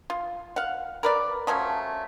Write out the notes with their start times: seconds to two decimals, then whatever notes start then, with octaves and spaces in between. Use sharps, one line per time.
0.10 F4
0.56 F5 F#5
1.03 A#4 B4 D5
1.47 F3 F#3 A3 C#4